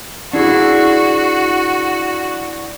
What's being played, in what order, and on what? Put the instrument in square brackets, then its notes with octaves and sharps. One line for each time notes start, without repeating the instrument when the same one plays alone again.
[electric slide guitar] D4 E4 G#4 [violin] F#4